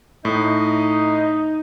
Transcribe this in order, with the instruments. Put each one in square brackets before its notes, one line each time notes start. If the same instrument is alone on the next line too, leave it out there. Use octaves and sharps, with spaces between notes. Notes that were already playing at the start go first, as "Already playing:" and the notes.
[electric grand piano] A2 [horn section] D#4